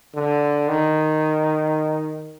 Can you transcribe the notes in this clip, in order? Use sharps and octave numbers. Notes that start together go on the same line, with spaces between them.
D3
D#3